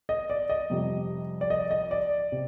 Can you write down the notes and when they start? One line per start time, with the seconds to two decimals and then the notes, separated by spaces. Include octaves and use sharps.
0.09 D#5
0.30 D5
0.50 D#5
0.70 F2 C3 G3
1.41 D5
1.50 D#5
1.71 D#5
1.91 D5
2.32 C3